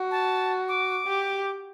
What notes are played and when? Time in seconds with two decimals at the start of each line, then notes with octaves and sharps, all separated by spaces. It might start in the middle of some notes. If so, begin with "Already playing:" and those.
Already playing: F#4
0.11 A5
0.68 D6
1.07 G4